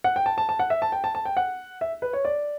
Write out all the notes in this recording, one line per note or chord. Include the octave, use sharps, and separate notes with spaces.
F#5
G5
A5
A5
A5
F#5
E5
A5
G5
A5
A5
G5
F#5
E5
B4
C#5
D5